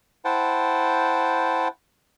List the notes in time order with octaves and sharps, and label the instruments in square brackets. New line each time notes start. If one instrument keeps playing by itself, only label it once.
[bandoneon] E4 C5 F#5 G5 A5